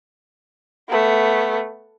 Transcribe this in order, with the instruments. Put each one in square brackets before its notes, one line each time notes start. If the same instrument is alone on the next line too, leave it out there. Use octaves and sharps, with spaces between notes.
[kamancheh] A3 B3